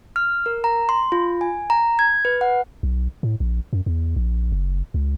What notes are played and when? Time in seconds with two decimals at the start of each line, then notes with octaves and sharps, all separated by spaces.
0.16 F6
0.46 A#4
0.64 A#5
0.89 C6
1.12 F4
1.41 G#5
1.70 A#5
1.99 G#6
2.25 B4
2.41 F#5
2.83 B1
3.23 A2
3.40 A#1
3.73 F#2
3.86 E2
4.16 A#1
4.52 F#1
4.94 C#2